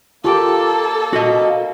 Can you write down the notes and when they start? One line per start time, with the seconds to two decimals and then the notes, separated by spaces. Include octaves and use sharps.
0.24 A#3 F4 G4 A4 D6
1.13 F#4 D#5